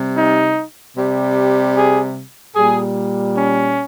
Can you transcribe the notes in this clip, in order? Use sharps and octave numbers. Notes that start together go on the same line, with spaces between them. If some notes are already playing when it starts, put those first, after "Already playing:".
Already playing: C3 G3
D#4
C3 G3
G#4
A#2 G3 G#4
C#4